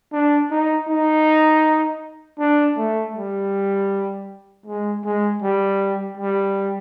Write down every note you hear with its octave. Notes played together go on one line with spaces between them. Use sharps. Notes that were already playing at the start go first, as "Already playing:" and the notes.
D4
D#4
D#4
D4
A3
G3
G#3
G#3
G3
G3